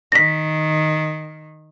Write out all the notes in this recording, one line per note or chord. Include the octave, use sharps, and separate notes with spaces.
D#3 A#6 B6